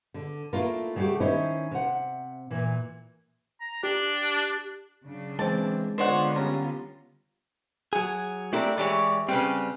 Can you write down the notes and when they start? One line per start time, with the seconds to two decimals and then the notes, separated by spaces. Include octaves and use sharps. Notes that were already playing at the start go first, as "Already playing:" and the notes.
0.14 D3
0.53 A3 A#3 D4 E4 F4 A#4
0.96 C#3 G3 A3 F#4 G4
1.20 D#3 C#4 D#4 E4 C5 C#5
1.71 C3 F#5
2.51 A#2 E3
3.61 A#5
3.83 D4 G4
5.03 C#3 F#3 D4
5.39 E3 G#3 C4 A5
5.98 D3 B3 D4 F4 C5 C#5 D#5 F#5
6.36 G3 C#4 A#5
7.93 F#3 G#4
8.53 A3 C4 D4 E4 G4 A#4
8.78 E3 G#3 G4 C#5 D5
9.29 C#3 G3 C4 B4 G5